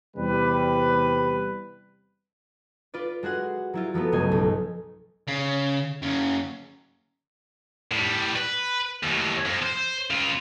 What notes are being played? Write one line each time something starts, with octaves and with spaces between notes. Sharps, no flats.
E2 C3 G3 B4
F4 B4 D5
G#3 F#4 G#4 F#5
F#3 E4 F4
F3 F#3 A3 B3
G1 C#2 A3 D#5 G#5
B1
C#3
F#2 C#3
A2 G3
B4
D#2 A2
F2
C5
C#3 F4